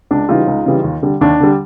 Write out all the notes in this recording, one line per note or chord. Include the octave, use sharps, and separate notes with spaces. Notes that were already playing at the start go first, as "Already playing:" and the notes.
C#2 D4
C#3 E3 G3 D#4 F4
C#2
C#3 E3 G3
D#2
D3 G3
D#2 D4
D3 G3